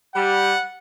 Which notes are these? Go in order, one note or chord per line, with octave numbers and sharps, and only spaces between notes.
G3 F#5